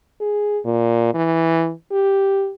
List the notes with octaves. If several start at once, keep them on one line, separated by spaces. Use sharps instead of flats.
G#4
A#2
E3
G4